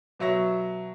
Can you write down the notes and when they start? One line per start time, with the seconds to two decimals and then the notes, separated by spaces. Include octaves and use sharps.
0.20 B2 F#3 E5 C#6 A#6